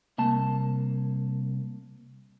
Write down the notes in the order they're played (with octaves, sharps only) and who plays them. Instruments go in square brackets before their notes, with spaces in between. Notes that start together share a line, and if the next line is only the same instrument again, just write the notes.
[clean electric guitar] C2 A#3 A5